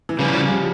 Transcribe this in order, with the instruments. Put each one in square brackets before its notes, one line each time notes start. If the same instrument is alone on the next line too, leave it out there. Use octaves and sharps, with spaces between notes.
[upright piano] E3
[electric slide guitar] C#3 G3 C#4 [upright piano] F3
[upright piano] F3
G3